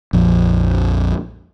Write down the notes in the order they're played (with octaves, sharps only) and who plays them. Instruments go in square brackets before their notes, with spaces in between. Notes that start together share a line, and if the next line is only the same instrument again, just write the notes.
[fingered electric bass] A#1 F2